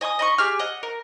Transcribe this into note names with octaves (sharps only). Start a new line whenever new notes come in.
D#5 G#5 B5 D#6
D#5 B5 C#6
G4 G#4 F6
D#5 F#5
A#4